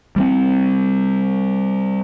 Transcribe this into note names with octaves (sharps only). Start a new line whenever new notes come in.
G3 A3 C4